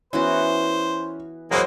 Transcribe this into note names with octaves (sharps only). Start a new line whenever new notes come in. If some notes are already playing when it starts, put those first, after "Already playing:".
E3 B3 C#4 F#4 C5
E3 F#3 G#3 A#3 C5